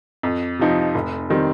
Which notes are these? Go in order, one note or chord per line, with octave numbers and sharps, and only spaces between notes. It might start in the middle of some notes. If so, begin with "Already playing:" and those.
F2
C3 F3 D#4
F1
D#3 G3 C4